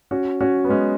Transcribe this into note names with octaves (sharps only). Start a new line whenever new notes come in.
C#4 F#4
C#4 F#4
B3
G#3 C#4